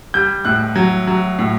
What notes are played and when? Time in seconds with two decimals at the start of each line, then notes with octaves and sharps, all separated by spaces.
0.14 G3 G6
0.45 A2 F#6
0.75 F#3
1.07 F#3
1.39 A2